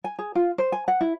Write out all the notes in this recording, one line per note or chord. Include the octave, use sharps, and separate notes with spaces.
G#5
G#4
F4
C5
G#5
F#5
E4